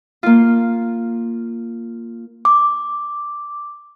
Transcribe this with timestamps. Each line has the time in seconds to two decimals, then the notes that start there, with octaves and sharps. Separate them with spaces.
0.23 A#3 F4
2.45 D6